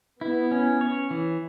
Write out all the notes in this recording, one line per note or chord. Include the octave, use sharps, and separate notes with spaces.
B3 E4
C#4
C#5
E3